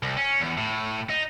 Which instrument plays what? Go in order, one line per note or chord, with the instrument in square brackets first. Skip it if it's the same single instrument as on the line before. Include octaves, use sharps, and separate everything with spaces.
[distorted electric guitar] C2
C#4
E2
A2
D#4